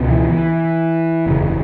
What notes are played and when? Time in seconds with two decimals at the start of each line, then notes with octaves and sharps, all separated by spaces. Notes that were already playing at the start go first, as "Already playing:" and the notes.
Already playing: C#2 B2
0.10 E3
0.30 E3
1.26 F#1 E2 C#3